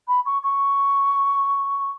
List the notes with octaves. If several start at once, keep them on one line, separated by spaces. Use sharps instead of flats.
B5
C#6
C#6